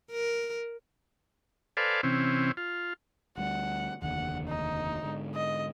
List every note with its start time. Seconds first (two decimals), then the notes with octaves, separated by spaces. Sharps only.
0.10 A#4
1.77 A4 B4 C5 D5 F5 G#5
2.03 C3 E3 C4 C#4
2.57 F4
3.38 D2 G3 F#5
4.02 F1 D#2 D3 F#5
4.48 D#4
5.03 G#2 D3
5.35 D#5